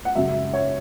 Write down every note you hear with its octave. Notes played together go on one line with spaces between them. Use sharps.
F#5
F#2 C#3 F#3 E5
C#5